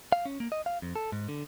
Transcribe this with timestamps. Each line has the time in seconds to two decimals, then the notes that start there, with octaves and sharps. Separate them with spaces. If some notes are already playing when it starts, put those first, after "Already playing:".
0.12 F5
0.25 C#4
0.40 A#3
0.52 D#5
0.66 F5
0.82 F2
0.96 A4
1.12 G#2
1.29 D3